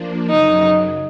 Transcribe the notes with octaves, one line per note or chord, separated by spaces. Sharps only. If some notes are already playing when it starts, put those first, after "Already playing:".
Already playing: F3 A#3 D4
F#2 C#3 F#3 D#4